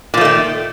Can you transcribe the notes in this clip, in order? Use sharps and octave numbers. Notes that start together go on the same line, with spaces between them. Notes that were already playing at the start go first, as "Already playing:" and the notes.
A#2 D#3 F3 A3